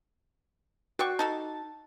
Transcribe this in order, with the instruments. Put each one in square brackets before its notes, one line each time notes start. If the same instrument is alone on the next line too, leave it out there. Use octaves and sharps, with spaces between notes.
[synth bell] F#4 [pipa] D5 G5 C#6
[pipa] D#4 F#4 A4 [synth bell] A5